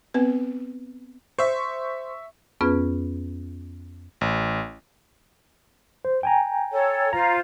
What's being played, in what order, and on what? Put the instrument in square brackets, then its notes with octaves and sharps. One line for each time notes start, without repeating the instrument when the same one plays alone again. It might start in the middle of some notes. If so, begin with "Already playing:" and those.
[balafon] B3 C4 B4
[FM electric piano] C5 [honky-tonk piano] E5 C#6
[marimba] F2 B3 C#4 F4 G#4 B4
[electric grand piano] A1
[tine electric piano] C5
G5 G#5 A#5
[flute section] A4 C#5
[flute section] F4 C5 F5 [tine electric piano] A#5